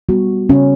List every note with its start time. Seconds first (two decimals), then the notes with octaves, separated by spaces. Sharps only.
0.09 G3 B3 F#4
0.49 C#3 C#4